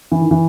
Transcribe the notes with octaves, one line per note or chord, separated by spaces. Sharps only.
E3
D#3
E3